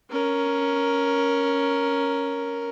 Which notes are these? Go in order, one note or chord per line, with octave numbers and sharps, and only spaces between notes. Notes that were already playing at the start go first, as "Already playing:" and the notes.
C#4 A#4